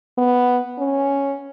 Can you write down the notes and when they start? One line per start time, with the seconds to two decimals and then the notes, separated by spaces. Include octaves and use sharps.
0.18 B3
0.79 C#4